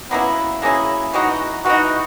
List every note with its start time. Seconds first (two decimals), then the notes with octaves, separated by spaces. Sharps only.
0.11 F#3 A#3 B3 C#4 E4
0.62 F#3 A#3 C#4 E4 G#4
1.13 E3 G#3 D#4 F#4
1.65 E3 G#3 D#4 F#4